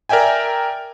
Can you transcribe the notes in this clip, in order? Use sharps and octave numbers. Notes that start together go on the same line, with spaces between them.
A#4 D5 E5 G5 G#5